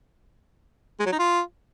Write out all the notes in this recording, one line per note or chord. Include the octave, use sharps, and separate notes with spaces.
G#3
F#3
D#4
F4